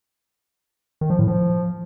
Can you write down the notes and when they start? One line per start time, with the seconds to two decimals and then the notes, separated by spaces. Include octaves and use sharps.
1.01 D#3
1.10 F3
1.19 A2
1.27 F3